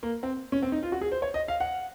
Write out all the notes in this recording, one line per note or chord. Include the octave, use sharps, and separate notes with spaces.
A#3
C4
C#4
C4
D#4
F4
F#4
G#4
C5
C#5
D#5
F5
F#5